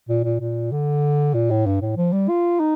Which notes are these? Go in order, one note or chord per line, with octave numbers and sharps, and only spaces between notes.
A#2
A#2
A#2
D3
A#2
A2
G2
A2
F3
G3
F4
D#4